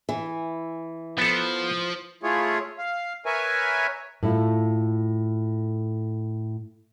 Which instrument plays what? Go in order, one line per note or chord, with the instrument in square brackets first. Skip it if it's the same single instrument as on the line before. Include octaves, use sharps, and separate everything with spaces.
[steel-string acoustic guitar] E3
[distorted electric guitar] F3 [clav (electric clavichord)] B3 A4
[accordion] A3 E4 F4 G#4 C#5
F5
A#4 B4 C#5 E5 G#5
[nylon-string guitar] A2 A3 E4 F4